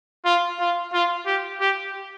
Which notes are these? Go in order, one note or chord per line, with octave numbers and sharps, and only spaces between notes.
F4
F4
F4
G4
G4